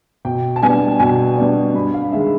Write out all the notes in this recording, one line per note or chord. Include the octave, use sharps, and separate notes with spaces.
B2 G5
A5
G3 B3 D4 G#5
B2 G#5
G3 B3 D4
G2 B5
F5
D#3 G#3 E5